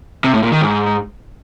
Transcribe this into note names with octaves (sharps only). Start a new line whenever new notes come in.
C3
A2
A#2
D#3
G#2